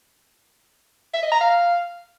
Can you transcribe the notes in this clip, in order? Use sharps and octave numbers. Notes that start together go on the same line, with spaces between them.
E5
D#5
A#5
F5